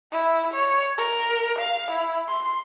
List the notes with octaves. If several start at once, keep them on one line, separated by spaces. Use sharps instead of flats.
E4
C#5
A#4
F5
E4
C6